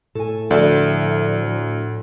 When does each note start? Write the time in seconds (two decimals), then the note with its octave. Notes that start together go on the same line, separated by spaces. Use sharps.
0.15 A2 A4 G#5
0.51 D2 F3 A4 D5 E5